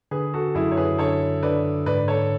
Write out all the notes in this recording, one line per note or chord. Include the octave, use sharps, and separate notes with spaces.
D3 G#4 B4
F#4 A4
F#2 E4 G#4
C#5
G#4 B4
D3 A4 C#5
D3 B4 D5
G#2 B4 D5
A4 C#5